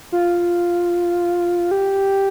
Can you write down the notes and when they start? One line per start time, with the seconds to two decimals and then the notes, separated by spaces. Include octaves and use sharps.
0.12 F4
1.71 G4